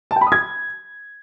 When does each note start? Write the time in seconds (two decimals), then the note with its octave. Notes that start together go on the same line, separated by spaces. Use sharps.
0.11 A5
0.16 G5
0.21 B5
0.27 D#6
0.32 G#6